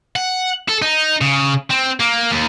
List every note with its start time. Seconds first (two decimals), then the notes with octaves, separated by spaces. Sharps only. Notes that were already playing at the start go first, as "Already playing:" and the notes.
0.16 F#5
0.69 A4
0.82 D#4
1.21 C#3
1.71 C4
2.00 A#3
2.31 D#2